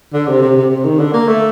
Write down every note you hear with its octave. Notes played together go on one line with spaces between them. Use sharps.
D3
C3
C3
C3
C3
D#3
D3
A#3
A3